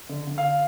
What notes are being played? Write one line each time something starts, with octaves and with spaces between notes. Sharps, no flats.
D3
D3
F5